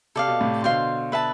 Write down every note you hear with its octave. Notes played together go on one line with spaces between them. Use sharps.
C3 A4 D5 F5
B2
A2 C3
B2 D3 C5 F5 C6
B4 E5 A5